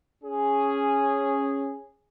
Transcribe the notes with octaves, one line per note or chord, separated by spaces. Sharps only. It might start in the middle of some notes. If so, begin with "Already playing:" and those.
C#4 G#4